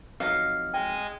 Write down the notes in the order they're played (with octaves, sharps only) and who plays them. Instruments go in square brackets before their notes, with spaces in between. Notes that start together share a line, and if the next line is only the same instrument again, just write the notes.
[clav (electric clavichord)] F2 F#3 D#4 [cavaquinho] F5
[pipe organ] G#3 D#5 G#5 [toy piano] G5